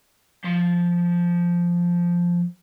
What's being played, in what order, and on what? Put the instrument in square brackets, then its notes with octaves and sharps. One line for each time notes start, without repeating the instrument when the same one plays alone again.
[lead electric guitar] F3 C6